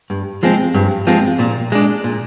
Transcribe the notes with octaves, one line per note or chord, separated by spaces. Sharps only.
G2
F3 G#3 C4
G2
F3 G#3 C4
A#2
G#3 D4
A#2